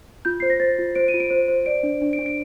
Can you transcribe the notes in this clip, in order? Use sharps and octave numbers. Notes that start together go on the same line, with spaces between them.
F4 G6
C5 C7
A#6
C5 A6
F4
C5 D7
D#7
F4
D7
C5
C5
D5 D7
D4
D4
D7
D4
D7